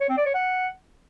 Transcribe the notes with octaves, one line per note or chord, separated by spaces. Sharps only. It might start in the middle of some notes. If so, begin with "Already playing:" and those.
C#5
C4
D5
C#5
F#5